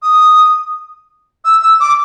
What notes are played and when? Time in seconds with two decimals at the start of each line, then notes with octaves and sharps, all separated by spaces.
0.02 D#6
1.45 E6
1.62 E6
1.80 D6